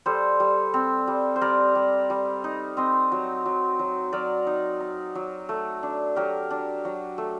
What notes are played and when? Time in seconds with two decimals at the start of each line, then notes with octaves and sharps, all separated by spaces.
0.06 G3 A4 C5
0.40 G3
0.74 C4
1.07 G3
1.36 C5
1.41 G3 A#4 D5
1.75 G3
2.10 G3
2.44 D#4
2.77 C4 C5 D#5
3.12 F#3
3.46 F#3
3.79 F#3
4.13 F#3 A#4 D5
4.47 D#4
4.80 D#4
5.15 F#3
5.49 A3
5.83 D4
6.16 F#3 G4 A#4
6.51 D4
6.85 F#3
7.18 A3